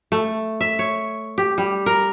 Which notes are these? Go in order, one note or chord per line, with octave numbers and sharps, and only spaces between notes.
A3
E5
C#5
G4
G3
A#4